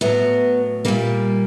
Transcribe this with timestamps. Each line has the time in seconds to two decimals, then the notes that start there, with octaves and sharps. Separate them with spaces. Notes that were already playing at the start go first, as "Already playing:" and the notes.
0.01 A2 F#3 B3
0.85 A#2 G3 A#3